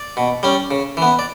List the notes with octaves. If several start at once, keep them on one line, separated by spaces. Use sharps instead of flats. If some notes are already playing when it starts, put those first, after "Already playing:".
Already playing: D5
B2
G3 C#4
C#3
E3 B3
D5